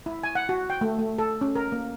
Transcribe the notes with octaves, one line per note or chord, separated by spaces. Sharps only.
E4
G#5
F#5
F#4
G5
A3
A3
A4
C#4
A#4
A#3